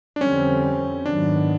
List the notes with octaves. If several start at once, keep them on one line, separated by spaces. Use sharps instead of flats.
D4
F2 D3 G3 C4 C#4
G#2 D#3 F#3 B3 D4